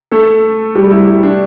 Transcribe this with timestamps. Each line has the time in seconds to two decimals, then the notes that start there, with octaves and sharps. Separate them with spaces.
0.11 A3 A4
0.75 G3 G4
0.91 E4
1.07 E4
1.23 D4